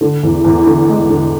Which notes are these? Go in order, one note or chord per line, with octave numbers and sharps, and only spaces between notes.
D3
E2
E2
D3
G#3
D3